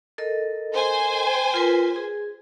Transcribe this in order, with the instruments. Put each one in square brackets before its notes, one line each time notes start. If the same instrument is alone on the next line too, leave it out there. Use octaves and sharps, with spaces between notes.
[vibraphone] A4 A#4 D#5
[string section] C5 G#5
[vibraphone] F4 A#4 B4
G#4